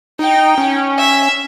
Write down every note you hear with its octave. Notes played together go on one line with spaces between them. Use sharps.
D#4 G5
C#4
E5